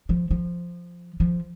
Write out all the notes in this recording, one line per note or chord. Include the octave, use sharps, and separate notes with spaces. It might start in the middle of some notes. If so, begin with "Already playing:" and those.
F3
F3
F3